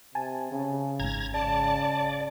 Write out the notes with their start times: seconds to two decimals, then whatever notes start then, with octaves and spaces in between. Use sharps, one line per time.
0.15 C3 G#5 A5
0.52 C#3
1.00 G#1 G#2 A#5 G#6
1.34 C#3 D5 A5